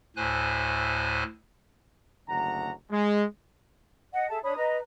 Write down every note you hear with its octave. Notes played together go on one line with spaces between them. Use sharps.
D2 A2 C5 G#5 F#6
F#1 D2 F#5 A#5
G#3
D#5 F#5
G#4 A4 E5 A5
D4 C#5 B5 D#6
B4 D#5 A#5